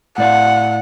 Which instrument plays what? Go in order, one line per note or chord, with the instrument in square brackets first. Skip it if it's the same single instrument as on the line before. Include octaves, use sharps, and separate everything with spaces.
[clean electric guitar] A2 D5 F5 [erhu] F#5